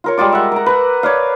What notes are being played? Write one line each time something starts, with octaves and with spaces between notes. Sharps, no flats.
F4 A#4 C#5
G3 G#3 F4 D6
E5 F#5
A#4 A#5
B4 A#5
C#5 D5 F5